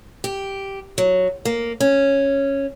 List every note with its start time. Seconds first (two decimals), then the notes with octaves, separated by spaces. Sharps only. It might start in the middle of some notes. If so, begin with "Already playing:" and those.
0.24 G4
0.98 F#3
1.45 A#3
1.80 C#4